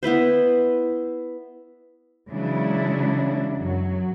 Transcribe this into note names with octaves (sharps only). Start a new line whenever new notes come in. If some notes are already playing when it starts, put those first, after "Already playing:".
B3 E4 B4 C5
C#3 E3 F#3 G#3 D4 E4
F#2 F#3